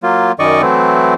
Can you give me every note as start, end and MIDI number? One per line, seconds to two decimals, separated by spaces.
0.03 0.32 54
0.03 0.32 58
0.03 0.32 65
0.39 0.62 42
0.39 0.62 51
0.39 0.62 74
0.39 0.62 75
0.39 0.62 85
0.62 1.14 52
0.62 1.14 54
0.62 1.14 57
0.62 1.14 60
0.62 1.14 64